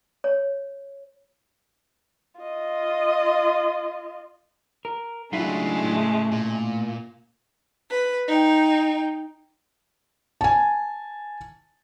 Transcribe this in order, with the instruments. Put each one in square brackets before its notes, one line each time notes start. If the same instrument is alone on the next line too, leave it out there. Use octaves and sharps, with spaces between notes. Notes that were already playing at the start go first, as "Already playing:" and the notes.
[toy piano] C#5
[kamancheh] F4 D#5
[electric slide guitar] A#4
[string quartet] C#3 G#3 A3 [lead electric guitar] F#3 D4 [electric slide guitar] E4 F4
[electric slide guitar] A2
[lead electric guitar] A#2
[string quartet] B4
D#4 G5
[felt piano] G#5 A5